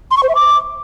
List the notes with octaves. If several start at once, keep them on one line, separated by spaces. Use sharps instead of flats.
C6
C#6
C5
E5
D6